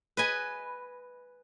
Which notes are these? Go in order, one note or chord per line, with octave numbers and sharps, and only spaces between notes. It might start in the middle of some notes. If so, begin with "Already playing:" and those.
B4 D#5 G#5 B5